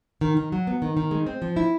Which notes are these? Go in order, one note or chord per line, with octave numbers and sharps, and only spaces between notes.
D#3
D#3
F#3
B3
D#3
D#3
G#3
C4
F3
E4